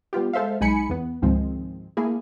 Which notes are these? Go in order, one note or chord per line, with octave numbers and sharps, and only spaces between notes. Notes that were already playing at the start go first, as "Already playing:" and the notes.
G3 B3 F4 G4
G#3 A4 C5 E5 F5
B1 G#3 D#4 G#5 B5 C#7
E2 B3
C#2 G#2 D#3 F3 G#3 C4
A3 A#3 E4 G#4